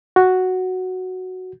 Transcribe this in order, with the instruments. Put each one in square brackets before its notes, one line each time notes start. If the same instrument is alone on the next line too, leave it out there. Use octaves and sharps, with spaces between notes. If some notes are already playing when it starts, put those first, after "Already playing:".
[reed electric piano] F#4